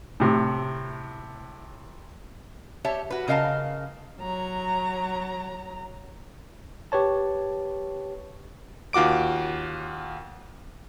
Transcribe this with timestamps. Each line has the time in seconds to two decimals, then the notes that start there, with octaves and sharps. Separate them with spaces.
0.20 A2 C3
2.85 G4 C#5 E5 A5
3.10 F#4 B4
3.28 C#3 A#4 D#5 F5 A5
4.19 F#3 A#5
6.92 G4 B4 C#5 A5
8.93 D#2 F4 F#4 D6 D7